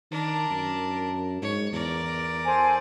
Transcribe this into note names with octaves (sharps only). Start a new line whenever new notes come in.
D#3 D4 A#4
F#2
G#2 C#5
E2 A#4 D5
A4 C5 G#5